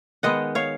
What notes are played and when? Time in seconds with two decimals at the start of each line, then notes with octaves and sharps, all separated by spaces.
0.23 D#3 G#3 B3 D#5 F#5
0.55 C#5 F5